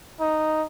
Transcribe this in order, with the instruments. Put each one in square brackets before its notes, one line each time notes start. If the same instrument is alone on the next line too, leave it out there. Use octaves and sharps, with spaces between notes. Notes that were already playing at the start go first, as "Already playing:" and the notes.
[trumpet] D#4